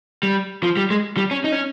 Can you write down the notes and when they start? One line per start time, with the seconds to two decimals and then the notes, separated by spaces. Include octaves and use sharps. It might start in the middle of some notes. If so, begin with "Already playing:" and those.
0.23 G3
0.63 F3
0.77 G3
0.91 G#3
1.17 G3
1.31 C#4
1.44 D#4
1.52 C#4